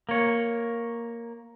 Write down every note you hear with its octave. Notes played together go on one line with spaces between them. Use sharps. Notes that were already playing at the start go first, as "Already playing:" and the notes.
A#3 C#5